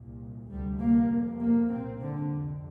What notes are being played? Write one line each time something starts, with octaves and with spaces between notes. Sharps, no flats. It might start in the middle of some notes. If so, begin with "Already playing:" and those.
Already playing: C2 A#2
D2 C3 G3
A#3
F2 C3
A#3
C2 A#2 C4
D3
F2 C3